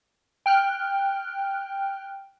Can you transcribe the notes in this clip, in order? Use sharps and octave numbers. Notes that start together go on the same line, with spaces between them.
G5 F6 F#6